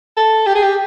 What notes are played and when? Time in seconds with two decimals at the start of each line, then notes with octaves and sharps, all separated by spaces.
0.17 A4
0.46 G4
0.55 G#4
0.63 G4